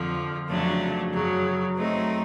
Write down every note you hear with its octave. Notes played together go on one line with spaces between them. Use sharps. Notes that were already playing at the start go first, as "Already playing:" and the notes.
Already playing: F2 D3 F3
F2 C#3 F#3 A3 D4
F#2 C#3 F#3
F#3 A3 C4 D#4